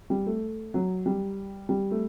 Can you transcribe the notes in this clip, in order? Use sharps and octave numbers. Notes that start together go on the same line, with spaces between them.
G3
A3
F#3
G3
G3
A3